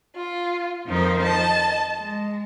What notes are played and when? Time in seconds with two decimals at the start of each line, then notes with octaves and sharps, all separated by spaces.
0.16 F4
0.87 F2 D#3 F3 D#4 A#4 C5
1.23 D#5 A5
1.98 G#3